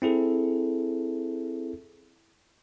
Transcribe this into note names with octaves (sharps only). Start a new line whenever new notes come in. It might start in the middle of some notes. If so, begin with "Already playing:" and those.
C4 E4 G#4 A4